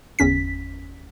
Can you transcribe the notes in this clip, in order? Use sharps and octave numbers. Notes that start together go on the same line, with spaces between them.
G1 E2 C#4 B6